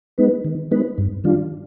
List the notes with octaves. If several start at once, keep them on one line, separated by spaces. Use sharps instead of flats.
G#3 B3 D#4 B4
D#3
G#3 B3 D#4 B4
G2
D#3 G3 D4 F4